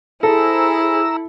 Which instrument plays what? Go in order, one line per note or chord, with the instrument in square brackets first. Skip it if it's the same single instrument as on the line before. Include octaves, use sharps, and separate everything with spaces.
[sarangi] E4 [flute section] G#4 C5 [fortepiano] A4 [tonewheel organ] A#5 E6